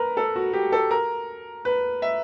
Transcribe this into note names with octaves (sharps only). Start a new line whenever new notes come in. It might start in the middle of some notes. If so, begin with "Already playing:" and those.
Already playing: A#4 B4
A4
F#4
G4
A4
A#4
B4
E5